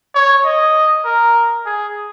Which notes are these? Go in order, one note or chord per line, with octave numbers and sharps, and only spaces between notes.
C#5
D#5
A#4
G#4